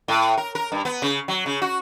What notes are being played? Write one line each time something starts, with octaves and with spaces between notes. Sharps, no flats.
A2
A#4
A#4
G2
B3
C#3
F#3
C#3
F#4